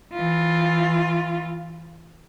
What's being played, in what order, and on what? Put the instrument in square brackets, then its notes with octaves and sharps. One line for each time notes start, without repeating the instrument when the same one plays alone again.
[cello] E3 F4